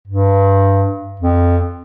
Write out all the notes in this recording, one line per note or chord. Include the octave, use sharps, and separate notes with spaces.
G2
F2